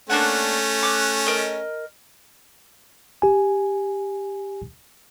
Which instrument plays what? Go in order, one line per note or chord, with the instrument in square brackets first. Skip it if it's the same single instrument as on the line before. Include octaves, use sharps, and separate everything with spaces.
[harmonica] A3 C#4 [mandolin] A#3 D4 F#5
[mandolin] D6 F#6
A#4 D#5
[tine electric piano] G4 G#5